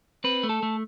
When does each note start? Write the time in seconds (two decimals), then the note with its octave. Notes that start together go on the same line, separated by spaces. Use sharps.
0.24 C4 B4
0.43 A3
0.49 A4
0.63 A3